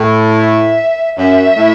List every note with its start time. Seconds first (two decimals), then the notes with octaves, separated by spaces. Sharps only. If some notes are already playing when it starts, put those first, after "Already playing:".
Already playing: A2
0.39 E5
1.18 F#2 E5
1.56 A2